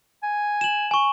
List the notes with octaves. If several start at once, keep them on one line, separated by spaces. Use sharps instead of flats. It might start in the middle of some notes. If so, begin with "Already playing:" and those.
G#5
E7 F#7
G#5 C#6